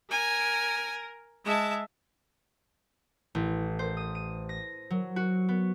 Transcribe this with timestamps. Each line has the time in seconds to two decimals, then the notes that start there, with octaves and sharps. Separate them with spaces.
0.11 A#4 G#5
1.45 G#3 E5 A5
3.35 A1
3.79 C5
3.97 D#6
4.15 D#7
4.49 A#6
4.90 F#3
5.16 F#4
5.49 B3